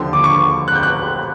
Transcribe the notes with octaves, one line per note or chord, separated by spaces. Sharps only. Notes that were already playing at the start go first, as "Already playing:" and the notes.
Already playing: D#2 D3 F3 C6
D6
C#6
F#6
G6
F#6